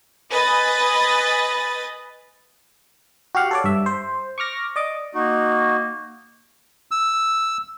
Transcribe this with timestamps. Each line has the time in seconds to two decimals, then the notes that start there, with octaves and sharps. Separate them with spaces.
0.30 B4 D#5 G#5 B5 D#6 A6
3.35 F#4 G4 F5 F#5
3.51 A4 C#5 D5
3.64 G2 E5
3.86 C5
4.38 C#6 D6 F6 A#6
4.76 D5 D#5 D6
5.14 A#3 D#4 F#4
6.91 E6